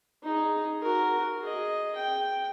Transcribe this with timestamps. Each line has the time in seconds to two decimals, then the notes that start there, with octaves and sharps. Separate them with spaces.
0.24 D#4 G#4
0.82 F#4 A#4
1.41 G#4 D#5
1.96 G5